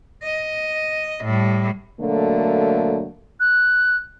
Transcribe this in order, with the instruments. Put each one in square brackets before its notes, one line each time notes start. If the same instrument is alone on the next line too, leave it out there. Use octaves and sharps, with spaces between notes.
[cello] D#5
A2 G3
[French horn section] B2 D3 F#3 A3 A#3
[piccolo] F#6